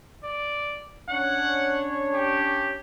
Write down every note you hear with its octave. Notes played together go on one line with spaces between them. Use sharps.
D5
C#4 D4 C#5 F#5
G4